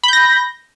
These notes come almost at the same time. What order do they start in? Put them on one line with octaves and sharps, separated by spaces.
B5 G6 A#6